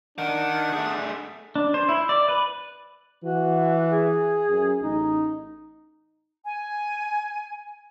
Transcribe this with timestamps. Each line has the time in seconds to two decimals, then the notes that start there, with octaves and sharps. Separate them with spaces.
0.18 D#3 D4 F#5
0.73 A3 G#4
1.56 D4
1.74 C5
1.89 E4
2.09 D5
2.28 B4
3.24 E3 F#4
3.91 G#4
4.50 F#2
4.82 A1 D#4
6.45 G#5